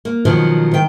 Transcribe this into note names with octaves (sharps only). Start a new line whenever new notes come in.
A#3
B2 D#3 F3 F#3
D#3 G5